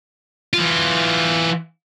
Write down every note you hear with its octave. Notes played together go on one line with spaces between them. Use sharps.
E3 F4